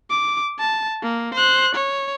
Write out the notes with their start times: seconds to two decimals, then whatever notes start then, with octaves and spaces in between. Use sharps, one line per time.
0.10 D6
0.59 A5
1.03 A#3
1.34 C5 F#6
1.75 C#5